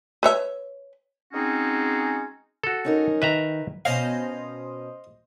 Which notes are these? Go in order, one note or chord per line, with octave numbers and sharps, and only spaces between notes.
B4 C#5 E5
G#3 C4 C#4 D#4 F#4 G#4
F#4 A4
C#4 D#4 A#4
D#3 B4 E5 A#5
B2 C#4 C5 D#5 F5